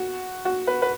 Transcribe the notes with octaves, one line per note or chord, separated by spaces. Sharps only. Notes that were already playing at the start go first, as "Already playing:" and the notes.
Already playing: F#4
F#4
B4
B4